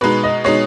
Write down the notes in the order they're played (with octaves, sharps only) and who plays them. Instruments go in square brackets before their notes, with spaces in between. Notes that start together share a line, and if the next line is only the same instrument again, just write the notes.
[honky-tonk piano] B2 G#3 D#4 [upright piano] B4
[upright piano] D#5
[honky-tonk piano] B2 G#3 D#4 [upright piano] C#5